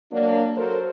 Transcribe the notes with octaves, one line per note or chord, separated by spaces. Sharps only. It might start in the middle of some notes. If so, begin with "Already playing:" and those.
F#3 A#3 D4
F#3 A4 A#4 C5